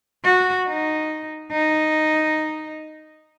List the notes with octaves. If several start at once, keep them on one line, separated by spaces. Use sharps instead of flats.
F#4
D#4
D#4